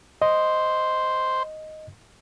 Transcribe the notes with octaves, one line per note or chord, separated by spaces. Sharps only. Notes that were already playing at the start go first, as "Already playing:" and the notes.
C5 D#5